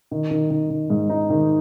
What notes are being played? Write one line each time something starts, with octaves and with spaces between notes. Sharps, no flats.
D#3
D#3
D#3
D#3
G#2
D#4
D#3